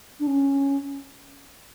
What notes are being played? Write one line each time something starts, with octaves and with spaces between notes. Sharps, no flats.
D4
C#4